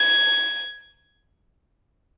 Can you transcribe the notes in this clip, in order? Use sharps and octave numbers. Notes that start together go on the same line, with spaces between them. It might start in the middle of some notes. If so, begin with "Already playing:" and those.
Already playing: G#6